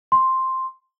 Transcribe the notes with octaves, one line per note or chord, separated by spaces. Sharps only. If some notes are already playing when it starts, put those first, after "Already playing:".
C6